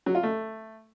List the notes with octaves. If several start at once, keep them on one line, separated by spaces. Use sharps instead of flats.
F#3
F4
A3